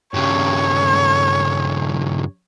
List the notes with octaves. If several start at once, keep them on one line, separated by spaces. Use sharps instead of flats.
G2 C#3 C#5